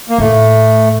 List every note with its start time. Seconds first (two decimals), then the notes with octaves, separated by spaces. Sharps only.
0.10 A#3
0.18 A2 A3